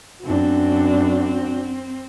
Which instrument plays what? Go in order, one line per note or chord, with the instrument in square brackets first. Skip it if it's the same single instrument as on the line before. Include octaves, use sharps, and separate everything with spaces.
[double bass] F#2 [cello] C4 [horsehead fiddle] D4 F#4